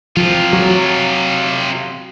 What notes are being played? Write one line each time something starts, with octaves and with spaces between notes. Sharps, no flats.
C3 F3 F4
F#3